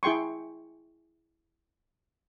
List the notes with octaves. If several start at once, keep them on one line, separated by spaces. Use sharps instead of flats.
E4 G#4 G5 C6 C#6